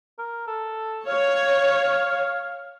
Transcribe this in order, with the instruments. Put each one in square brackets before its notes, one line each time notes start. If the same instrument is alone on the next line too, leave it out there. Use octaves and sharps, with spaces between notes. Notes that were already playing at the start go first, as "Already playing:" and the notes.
[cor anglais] A#4
A4
[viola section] C#5 [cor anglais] F5